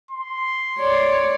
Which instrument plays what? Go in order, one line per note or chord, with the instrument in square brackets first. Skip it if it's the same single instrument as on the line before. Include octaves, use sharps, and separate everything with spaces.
[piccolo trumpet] C6
[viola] C#5 D5